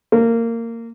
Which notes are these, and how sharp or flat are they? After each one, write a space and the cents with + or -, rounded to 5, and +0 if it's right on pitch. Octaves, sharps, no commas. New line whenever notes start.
A#3 -20